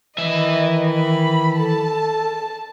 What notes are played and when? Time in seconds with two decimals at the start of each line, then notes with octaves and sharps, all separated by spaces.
0.18 D#3 E3 D#5 E5
0.90 B5
1.58 A4 A5